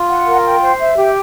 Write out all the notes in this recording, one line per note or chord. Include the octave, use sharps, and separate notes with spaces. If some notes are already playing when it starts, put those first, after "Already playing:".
Already playing: F4
F#5
A#4
G5
C5
E5
G4